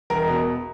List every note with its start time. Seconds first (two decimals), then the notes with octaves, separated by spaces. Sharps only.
0.10 E1 A#4
0.28 B2